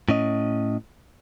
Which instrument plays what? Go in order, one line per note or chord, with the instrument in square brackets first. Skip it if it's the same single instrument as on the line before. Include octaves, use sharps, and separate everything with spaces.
[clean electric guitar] A2 C#4 D#5